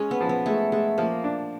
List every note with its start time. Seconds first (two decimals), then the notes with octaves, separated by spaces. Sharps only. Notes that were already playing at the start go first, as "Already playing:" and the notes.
Already playing: G#3 C#4
0.11 B3
0.21 F3
0.29 B3
0.46 G#3 A3
0.72 G#3 A3
0.98 F3 A#3
1.24 D4